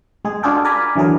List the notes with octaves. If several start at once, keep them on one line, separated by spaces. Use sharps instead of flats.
G#3 G#4
D4 F4 F#4 G#4 A4 G5
A#4 D5 G#5 A#5 B5
D3 E3 F#3 G#4 A#4